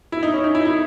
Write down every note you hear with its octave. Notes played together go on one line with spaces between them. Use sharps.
E4
D#4
C#4
D#4
E4
D#4
E4